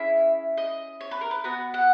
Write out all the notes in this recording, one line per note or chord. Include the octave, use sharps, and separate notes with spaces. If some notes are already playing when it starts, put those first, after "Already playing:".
Already playing: C#4 E4 G#4 E5
D#5
C#5
B4
A#4
B4
B3 F#4 B4
F#5